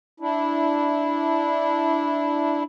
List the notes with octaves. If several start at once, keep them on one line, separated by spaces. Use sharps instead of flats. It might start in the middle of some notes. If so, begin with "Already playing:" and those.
D4 E4